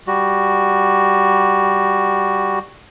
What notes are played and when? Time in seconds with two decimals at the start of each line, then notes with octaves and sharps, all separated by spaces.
0.07 G3 F#4